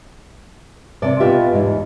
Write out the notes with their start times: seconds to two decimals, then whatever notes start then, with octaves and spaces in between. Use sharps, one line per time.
1.02 C3 D5
1.20 B2 F4 G4 B4 E5
1.53 E2 G#2